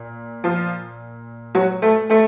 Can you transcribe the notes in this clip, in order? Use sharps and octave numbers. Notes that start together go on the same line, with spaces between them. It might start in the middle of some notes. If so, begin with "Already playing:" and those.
Already playing: A#2
F3 F4
F#3 F#4
A3 A4
A3 A4